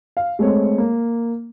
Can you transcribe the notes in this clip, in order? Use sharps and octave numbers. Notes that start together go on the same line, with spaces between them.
F5
G#3 A3 C4 C#5
A#3